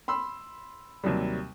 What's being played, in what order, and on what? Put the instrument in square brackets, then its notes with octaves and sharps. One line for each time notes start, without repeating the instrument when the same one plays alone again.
[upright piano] B5 C6 E6
D#2 C3 F#3 G3